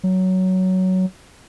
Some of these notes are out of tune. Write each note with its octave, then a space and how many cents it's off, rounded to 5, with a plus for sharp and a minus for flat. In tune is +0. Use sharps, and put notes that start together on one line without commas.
F#3 +10